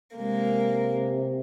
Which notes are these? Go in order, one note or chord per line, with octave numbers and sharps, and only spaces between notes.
C3 G#3 A#3